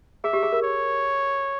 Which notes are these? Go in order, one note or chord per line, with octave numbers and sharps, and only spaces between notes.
G#4 E5
G4
G#4
A#4
C#5